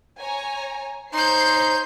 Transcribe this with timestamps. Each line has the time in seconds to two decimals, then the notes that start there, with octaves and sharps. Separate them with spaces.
0.20 C#5 G#5 A#5
1.13 D#4 C5 C#5 C6 G6 C7